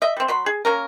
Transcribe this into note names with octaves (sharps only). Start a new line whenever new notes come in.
D#5 E5
G3 C4
F#3 B5 C6
G#4
A#3 C#4 A#4